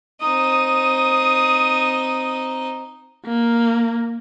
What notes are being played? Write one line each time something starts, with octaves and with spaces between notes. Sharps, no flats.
C4 D#4 D#6
A#3